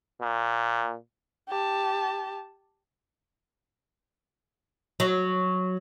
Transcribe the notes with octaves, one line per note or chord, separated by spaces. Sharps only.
A#2
G4 A5
F#3